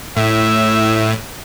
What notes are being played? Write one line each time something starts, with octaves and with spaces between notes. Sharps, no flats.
A2 E5